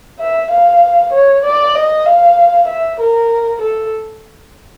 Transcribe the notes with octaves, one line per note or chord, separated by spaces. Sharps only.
E5
F5
C#5
D5
D#5
F5
E5
A#4
A4